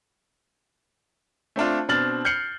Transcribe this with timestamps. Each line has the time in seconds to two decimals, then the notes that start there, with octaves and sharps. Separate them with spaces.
1.56 A3 C4 D4 F4
1.89 B2 C4 D4 F6 A6 F#7
2.25 F6 G6 C7 C#7 F#7